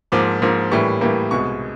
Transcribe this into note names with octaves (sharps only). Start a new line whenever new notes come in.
G#2 F3 A#3 D6
G#2 F3 A#3
A2 E3 G3 A#3 C#6
A2 E3 G3 A#3
C2 B2 G#3 C#6